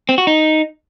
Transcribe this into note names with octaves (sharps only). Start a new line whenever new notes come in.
C4
F#4
D#4